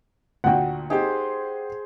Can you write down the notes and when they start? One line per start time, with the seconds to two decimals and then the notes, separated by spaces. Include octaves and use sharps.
0.44 D2 A#2 F#4 F#5 G5
0.90 D#4 G4 G#4 C5